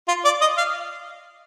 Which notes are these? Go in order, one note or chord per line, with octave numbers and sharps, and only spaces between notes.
F4
D5
D#5
F5